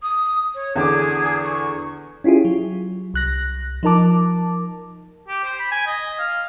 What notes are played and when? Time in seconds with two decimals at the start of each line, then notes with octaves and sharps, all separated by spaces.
0.02 D#6
0.55 C#5
0.76 E2 D3 G#4 D6
1.44 C#6
2.24 C#4 E4 F4 G4 G#4
2.45 F#3
3.14 C2 F#6 A#6
3.83 F3 D#4 A#4 A5 D6
5.28 G4
5.44 C5
5.59 B5
5.71 G#5
5.86 D#5
6.19 F5